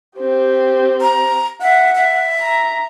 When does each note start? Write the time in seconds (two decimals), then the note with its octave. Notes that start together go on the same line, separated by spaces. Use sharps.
0.19 C4 G4
1.01 A#5
1.61 E5 F#5
1.95 E5
2.42 A#5